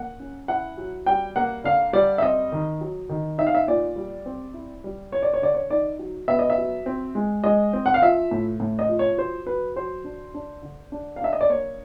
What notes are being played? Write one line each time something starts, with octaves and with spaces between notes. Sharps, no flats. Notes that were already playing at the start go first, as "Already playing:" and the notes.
Already playing: A#3 F#5
C#4
E4 F#5
F#3
G3 G5
A#3 F#5
D3 F5
G3 D5
E5
C4 D#5
D#3
F#3
D#3
D#4 E5
F5
E5
A#2 D5
G3
C4
E4
G3
E4 C#5
D5
C#5
D3 D5
C#5
D#4 D5
F#3
B3 E5
D#5
E5
F#3
C4
G#3
G#3 D#5
C4
F#5
F5
F3 E5
A2
A2
D#5
F3
C#5
F#3 C5
F#3 B4
F#3 C5
D4
D4
D3
D4
F5
D4 E5
D#5
D5
A#3 C#5